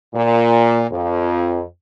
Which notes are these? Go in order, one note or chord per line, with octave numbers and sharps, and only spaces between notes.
A#2
F2